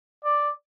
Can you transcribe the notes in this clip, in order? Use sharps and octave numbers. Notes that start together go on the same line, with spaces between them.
D5